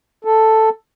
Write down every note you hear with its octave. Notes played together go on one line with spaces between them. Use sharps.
A4